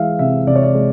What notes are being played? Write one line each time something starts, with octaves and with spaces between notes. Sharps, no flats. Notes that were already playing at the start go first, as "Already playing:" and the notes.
Already playing: E3 G#3 E5 F5
C3 E5
C3 D5
C#5
D5
G#3